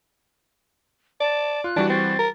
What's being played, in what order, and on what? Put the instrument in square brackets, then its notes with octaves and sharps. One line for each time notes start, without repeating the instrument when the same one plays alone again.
[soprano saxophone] D5 [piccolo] A5
[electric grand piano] F4 [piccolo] F#6
[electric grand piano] E3 G3 F#4 [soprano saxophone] D4
[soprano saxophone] C4 [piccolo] A6
[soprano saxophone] A#4